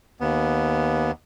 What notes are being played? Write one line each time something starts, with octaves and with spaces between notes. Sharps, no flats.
D#2 B3